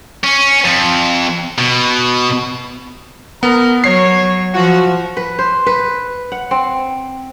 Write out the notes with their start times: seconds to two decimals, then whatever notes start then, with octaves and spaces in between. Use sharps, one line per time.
0.24 C#4
0.65 F2
1.58 B2
3.43 B3 A#4 A#5
3.84 F#3 C#5 C7
4.54 F3 F#4
5.17 B4
5.39 C5
5.66 B4
6.32 F#5
6.51 C4